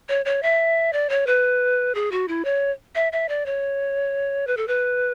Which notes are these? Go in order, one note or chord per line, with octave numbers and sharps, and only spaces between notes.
C#5
C#5
E5
D5
C#5
B4
G#4
F#4
E4
C#5
E5
E5
D5
C#5
B4
A4
B4